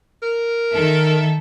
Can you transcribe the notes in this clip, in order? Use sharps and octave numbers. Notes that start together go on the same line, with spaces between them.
A#4
D#3 A4 E5